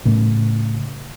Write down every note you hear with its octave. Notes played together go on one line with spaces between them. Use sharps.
A2 C#3